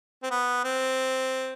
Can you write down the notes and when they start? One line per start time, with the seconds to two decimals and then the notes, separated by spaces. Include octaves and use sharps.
0.23 C4
0.31 B3
0.64 C4